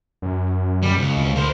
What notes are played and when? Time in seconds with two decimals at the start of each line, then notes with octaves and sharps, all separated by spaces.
0.22 F#2
0.83 G3
0.98 C#2
1.17 D2
1.36 A#4 C5